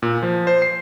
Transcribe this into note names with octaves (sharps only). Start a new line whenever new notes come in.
A#2
F3
C5
C7